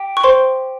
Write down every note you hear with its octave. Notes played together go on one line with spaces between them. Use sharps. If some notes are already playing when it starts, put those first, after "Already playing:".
Already playing: G4
C#6
C5 C6